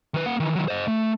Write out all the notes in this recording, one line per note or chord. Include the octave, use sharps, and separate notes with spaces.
D#3 B4
A#3 F#5
D#3 E3
D#3 F#3
C5 D#5
A3